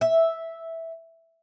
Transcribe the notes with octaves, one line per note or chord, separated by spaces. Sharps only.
E5